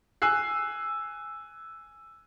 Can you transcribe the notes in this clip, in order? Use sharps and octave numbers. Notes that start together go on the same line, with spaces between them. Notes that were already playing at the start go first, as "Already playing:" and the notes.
G#5 E6 F#6 C7